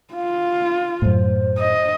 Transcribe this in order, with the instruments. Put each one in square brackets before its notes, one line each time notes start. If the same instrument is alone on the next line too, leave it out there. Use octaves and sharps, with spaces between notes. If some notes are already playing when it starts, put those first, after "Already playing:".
[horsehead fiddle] F4 [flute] F5
[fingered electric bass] F#2 A2 [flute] C5
[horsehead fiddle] D#5